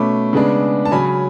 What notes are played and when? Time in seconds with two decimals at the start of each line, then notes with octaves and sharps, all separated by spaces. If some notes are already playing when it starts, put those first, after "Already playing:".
Already playing: B2 A3 C#4 B5 D6
0.33 C#3 G#3 B3 D4
0.85 A5
0.91 C#3 F#3 C#4 G#5 B5